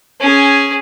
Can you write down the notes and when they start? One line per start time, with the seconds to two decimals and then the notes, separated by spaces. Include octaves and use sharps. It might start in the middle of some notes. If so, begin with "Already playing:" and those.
0.20 C#4 G#4